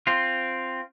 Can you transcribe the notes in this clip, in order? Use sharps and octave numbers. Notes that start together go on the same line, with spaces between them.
C4 F4